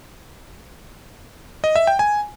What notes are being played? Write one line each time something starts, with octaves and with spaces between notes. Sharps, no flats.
D#5
E5
G5
G#5